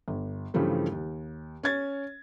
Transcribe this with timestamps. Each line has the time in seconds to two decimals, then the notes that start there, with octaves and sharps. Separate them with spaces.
0.08 G1
0.54 G2 C#3 E3 F3 G3 A3
0.92 D#2
1.63 C#4 C#5 G#6 A6